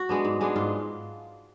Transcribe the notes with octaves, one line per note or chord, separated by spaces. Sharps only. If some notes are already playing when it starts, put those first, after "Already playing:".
Already playing: F#4
G#3 B3 D4
G#2
G#3 B3 D4
G#2 F4